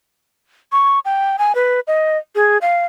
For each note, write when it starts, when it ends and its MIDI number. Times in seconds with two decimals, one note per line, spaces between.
0.72 0.99 85
1.05 1.36 79
1.38 1.55 80
1.55 1.80 71
1.87 2.18 75
2.35 2.58 68
2.61 2.86 77